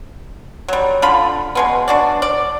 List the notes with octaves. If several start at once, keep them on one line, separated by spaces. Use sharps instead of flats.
F#3 G3
D3 F4 B5
B2 G#3 B3
D4 F#4 D5
D5